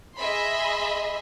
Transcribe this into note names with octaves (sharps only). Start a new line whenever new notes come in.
G#4 D#5 E5 B5 C6